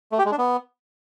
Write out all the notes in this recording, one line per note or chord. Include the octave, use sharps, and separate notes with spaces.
A3
G4
G#3
D4
B3